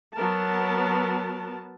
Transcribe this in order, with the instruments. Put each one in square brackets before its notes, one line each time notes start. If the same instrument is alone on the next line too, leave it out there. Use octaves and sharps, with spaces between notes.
[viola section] F#3 B3 A#4 A5